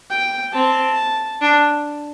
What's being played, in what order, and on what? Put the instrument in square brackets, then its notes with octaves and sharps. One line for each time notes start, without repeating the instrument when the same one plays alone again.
[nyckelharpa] G5
[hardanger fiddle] C4 [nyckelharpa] A5
[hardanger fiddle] D4